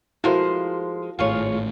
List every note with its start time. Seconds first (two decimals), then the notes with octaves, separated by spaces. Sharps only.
0.24 F3 G#3 E4 F#4 A4 A#4 C5
1.19 G#1 A2 F4 G#4 C#5